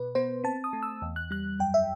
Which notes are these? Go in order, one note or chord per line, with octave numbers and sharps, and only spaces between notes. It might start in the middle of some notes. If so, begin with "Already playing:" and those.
Already playing: B2 B4
B3 C5
C4 A5
D#6
A3
E6
E2
F#6
G3 F#6
F#2 G5
E5